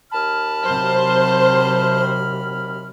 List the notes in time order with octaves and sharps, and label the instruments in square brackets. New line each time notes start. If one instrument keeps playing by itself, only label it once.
[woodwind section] D#2 B5 F6 [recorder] A5
[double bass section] C3 F#3 [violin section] C5